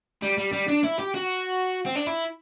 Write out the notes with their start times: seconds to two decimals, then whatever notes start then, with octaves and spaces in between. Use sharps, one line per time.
0.22 G3
0.38 G3
0.53 G3
0.68 D4
0.84 E4
0.99 G4
1.15 F#4
1.86 C4
1.95 D4
2.07 E4